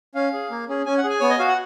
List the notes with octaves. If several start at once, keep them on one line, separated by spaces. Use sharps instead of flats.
C#4 F5
G#4
A#3
C#4 G#4
C#4 G#5
F#5
G#4
G#5
B3 C#5
D#5
F#4 F5
F#5